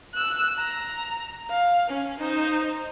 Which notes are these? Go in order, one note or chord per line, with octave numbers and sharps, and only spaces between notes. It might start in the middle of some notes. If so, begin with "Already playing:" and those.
E6 F#6
A#5
F5
C#4
D#4 C5